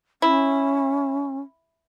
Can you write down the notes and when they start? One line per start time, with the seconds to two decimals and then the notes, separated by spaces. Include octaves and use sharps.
0.22 C#4 E4